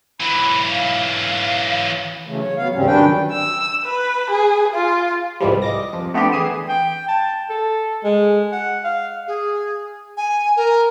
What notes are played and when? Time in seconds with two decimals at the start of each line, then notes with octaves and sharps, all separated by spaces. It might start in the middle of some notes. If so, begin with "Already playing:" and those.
0.20 E3 F#3 B5
0.71 F5
2.26 C#3 E3 F#3 A3
2.40 C#5
2.57 F#3 B3 F5
2.75 D#2 G#2 C#3 G3 C4 C#4
2.87 F#2 D#3 D4 B4 G5
3.32 E6
3.84 B4
4.30 G#4
4.74 F4
5.40 C2 G#2 E3 F3 G3
5.62 D#5 D6 A#6
5.93 F2
6.14 A3 B3 C4 D4 G4
6.32 E3 G#4 C7 D#7 E7
6.69 G5
7.08 A5
7.50 A4
8.04 G#3
8.52 F#5
8.84 F5
9.27 G#4
10.17 G#5
10.57 A#4